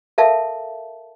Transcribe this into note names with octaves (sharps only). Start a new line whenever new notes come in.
A4 A#4 E5 F5 A5